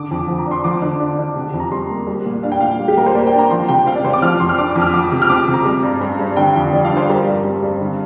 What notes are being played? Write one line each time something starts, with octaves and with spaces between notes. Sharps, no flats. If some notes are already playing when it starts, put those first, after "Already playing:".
Already playing: D3 D6
F2
F3
A#5
D4 C6
F3 D6
D3
D4
D3
C3
F2
A#5
G3 C6
A#3
G3
A#2
D4 F5
G5
A#2 F5
G3
G4
A#2 A#4
C5
A#3 D5
G5
D4
A#5
F3 C6
C3 G5
C4 F5
D5
C3 C5
D6
F3 F6
F2 C6
F6
D4 D6
D6
F2
F6
F3 D6
C3
F6
C4 D6
C3
A#5
G3
G2
C4
G2
D3 G5
F2
F3 D5
F5
D4
C5
G3 A#4
G2
C4
G2
D3